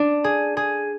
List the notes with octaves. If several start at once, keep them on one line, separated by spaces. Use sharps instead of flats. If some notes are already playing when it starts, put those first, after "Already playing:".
Already playing: D4
G#4
G#4